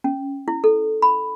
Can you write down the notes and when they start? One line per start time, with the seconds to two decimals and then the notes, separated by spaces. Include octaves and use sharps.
0.04 C#4
0.48 E4
0.64 A4
1.02 B5